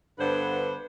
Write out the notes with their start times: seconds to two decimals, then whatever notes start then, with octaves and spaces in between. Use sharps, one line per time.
0.19 G2 D3 B3 B4 C5